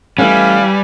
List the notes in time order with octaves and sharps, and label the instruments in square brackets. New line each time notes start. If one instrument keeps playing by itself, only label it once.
[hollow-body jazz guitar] E3 A3 C#4 [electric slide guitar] G3 [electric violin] B4 G#5 [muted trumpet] F5